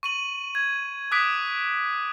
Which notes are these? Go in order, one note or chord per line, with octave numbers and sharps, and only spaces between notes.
C#6 D#7 F#7
G#6
D6 D#6 F#6 G#6 B6 D7